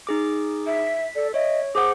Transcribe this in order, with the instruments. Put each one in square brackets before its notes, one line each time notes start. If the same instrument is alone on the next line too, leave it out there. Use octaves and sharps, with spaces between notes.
[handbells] D#4 G#4 D6
[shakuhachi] E5
[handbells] B6
[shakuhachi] A4 [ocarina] D5
[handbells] C#5 [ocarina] D#5 [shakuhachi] E5
[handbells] G#4 C5 F#5 [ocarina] D6 [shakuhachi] D#6